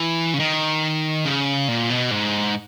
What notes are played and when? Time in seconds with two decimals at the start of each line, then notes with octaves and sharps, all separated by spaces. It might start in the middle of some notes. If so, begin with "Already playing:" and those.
Already playing: E3
0.34 C#3
0.40 D#3
1.25 C#3
1.68 A#2
1.90 B2
2.11 G#2